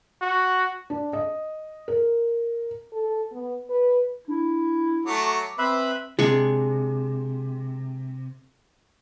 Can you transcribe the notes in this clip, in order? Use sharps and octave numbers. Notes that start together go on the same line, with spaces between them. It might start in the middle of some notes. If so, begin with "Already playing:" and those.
F#4
D4
D#5
A#4
A4
B3
B4
D4 E4
F#3 A3 D6
C4 B4 C5 E5 B5
C3 G#3 D4 C#6